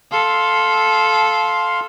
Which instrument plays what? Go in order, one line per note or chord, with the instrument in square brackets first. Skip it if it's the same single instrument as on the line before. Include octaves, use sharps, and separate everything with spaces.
[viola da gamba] A4 [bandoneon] F5 C6